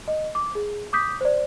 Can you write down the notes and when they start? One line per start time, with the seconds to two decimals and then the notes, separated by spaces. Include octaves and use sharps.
0.08 D#5
0.35 D6
0.55 G#4
0.93 D6 D#6 G6 B6
1.21 C5 D5